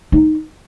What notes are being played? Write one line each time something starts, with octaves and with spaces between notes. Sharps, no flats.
D#4